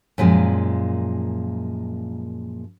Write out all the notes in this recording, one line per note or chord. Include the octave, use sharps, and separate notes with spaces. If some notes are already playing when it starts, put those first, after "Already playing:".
F#2 A#2 F3 G#3